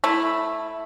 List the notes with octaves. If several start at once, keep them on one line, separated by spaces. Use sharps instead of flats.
A3 E4